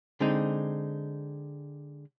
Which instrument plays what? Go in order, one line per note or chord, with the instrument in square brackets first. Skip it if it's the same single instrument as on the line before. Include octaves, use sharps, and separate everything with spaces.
[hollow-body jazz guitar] D3 G#3 C4 D#4